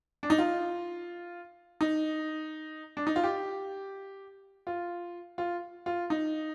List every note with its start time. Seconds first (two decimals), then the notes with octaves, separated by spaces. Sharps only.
0.23 D4
0.30 D#4
0.38 F4
1.81 D#4
2.97 D4
3.07 D#4
3.16 F4
3.24 G4
4.67 F4
5.38 F4
5.86 F4
6.10 D#4